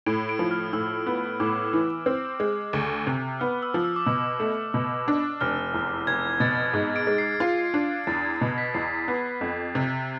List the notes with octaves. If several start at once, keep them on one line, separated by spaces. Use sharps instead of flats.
A2 D7
D7
F3
F6
A2 E6
B3
A2 D6
E3
C4 E6
G#3
D2
C3
B3 F6
E6
F3
E6
D6
B2 E6
A3
B2
D4
F1 F6
E2
F1 G#6
B2 A6
G#2
D7
G#3
C7
F4
D4
E2 A6
G#6
B2
B6
E2 C7
B3
F2
C3